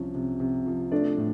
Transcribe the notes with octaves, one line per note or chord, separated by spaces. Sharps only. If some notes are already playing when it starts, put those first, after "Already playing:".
Already playing: C2 C3 F3 C#4
C3
C3
F3
A3 D4 D5
A2